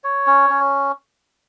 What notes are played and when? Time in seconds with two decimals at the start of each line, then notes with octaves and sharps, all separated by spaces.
0.04 C#5
0.27 C#4
0.50 C#4